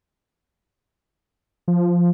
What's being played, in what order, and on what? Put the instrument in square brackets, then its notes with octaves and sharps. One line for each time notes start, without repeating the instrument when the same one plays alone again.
[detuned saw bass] F3